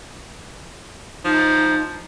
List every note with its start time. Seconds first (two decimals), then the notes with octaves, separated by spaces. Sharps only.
1.25 F3 D#4